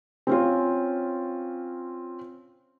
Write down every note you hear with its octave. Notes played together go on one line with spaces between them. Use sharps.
C4 C#4 F4